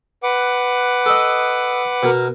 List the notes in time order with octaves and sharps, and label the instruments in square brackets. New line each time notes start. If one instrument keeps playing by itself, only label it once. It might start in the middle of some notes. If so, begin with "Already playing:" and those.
[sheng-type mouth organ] B4 F#5 D6
[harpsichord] A4 D#5
B2 A#4